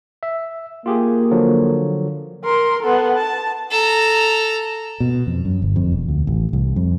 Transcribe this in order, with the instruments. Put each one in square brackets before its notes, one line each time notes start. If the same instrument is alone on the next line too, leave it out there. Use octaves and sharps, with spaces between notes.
[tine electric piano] E5
[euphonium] A#3 [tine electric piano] F4 G4 G#4
[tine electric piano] D3 F3 F#3
[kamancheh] A#4 C6
B3 A4
A5
[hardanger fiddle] A4 A#5
[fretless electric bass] B2
F2
F#2
G1
F2
E1
D2
A1
C2
F2